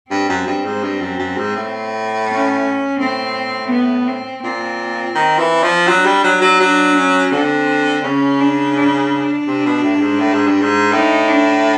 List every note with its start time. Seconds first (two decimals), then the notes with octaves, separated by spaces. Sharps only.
0.11 G2 C4
0.29 F#2
0.47 G2
0.66 G#2
0.83 G2
1.01 F#2
1.19 F#2
1.37 G#2
1.56 A2
2.27 C#4
2.99 A2 C4
3.71 B3
4.08 C4
4.43 A#2 C4
5.16 D#3
5.39 E3
5.63 F3
5.87 F#3 D4
6.05 G3
6.24 F#3
6.41 F#3
6.60 F#3 D4
6.96 C#4
7.31 D3 C4
8.04 C#3 C#4
8.40 D4
8.76 D4
9.47 C3
9.66 B2
9.83 A2
9.95 G2
10.02 G#2
10.20 A2
10.34 G#2
10.47 G2
10.61 G#2
10.92 A2 D#4
11.28 D4